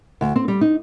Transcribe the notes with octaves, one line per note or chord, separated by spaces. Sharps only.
D2
C4
G3
D#4